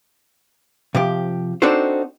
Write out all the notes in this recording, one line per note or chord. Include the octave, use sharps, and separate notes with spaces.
C3 F3 G4
C4 D4 D#4 F#4 A4 C5